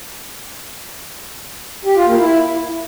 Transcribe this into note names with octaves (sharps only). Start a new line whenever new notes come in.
G4
F4
A#3
E4